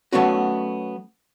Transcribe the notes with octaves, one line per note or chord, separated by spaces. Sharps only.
F#3 A3 B3 C#4 F#4